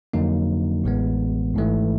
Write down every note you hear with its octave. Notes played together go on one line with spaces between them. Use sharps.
F2 D3 F#3 A#3 D#4
A1 A2 E3 G#3 B3
G#1 G#2 E3 A3